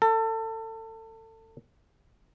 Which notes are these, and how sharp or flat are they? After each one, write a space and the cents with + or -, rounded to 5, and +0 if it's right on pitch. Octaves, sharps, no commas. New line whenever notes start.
A4 +30